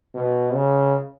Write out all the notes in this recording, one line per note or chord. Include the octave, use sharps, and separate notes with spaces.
B2
C#3